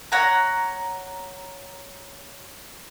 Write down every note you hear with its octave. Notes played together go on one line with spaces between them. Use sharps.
C#5 F#5 A#5